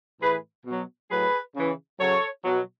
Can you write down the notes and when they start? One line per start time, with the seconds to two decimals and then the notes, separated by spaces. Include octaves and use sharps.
0.21 A2 E3 G#4 B4
0.66 B2 F#3
1.10 A2 F#3 G#4 B4
1.55 C#3 E3
1.99 C#3 F#3 A4 C#5
2.44 B2 F#3